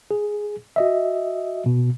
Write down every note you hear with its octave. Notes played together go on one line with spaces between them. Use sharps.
G#4
F#4 D#5 E5
B2